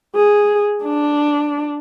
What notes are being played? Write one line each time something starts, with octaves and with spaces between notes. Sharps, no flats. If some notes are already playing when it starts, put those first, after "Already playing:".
G#4
D4